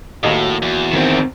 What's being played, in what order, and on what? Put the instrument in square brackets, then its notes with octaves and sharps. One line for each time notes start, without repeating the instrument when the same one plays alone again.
[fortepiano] D#2 A4 D#5 [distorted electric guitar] A2 [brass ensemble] A#3 F#4
[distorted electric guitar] E2
[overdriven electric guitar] D#3 C4